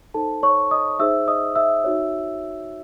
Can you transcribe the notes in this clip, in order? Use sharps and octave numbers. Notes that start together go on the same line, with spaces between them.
D#4 A4 C5 A5
C#5 C#6
D#5 D#6
D#4 G#4 C5 E5 E6
D#5 D#6
E5 E6
D#4 F#4 C#5